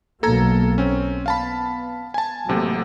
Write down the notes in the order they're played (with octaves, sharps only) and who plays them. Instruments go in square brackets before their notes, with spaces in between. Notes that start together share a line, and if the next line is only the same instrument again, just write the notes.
[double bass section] B1 A#3 [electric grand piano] A4 A#5 G#6
[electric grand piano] C4 C#4
[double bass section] B3 [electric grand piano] F5 A5 B5
[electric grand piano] G#5 A5
[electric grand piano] A1 C3 C4 [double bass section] F#3 A3 A#3